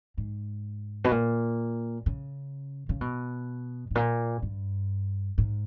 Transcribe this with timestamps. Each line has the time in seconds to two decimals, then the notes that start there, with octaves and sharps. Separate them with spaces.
0.18 G#2
1.04 B2
1.11 A#2
2.06 C#3
2.89 C#3
3.01 B2
3.91 G#2
3.95 A#2
4.42 G2
5.38 G#2